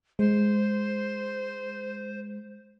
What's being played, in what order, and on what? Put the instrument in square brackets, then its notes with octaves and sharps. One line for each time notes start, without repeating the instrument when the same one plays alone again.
[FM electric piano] G#3 [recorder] C5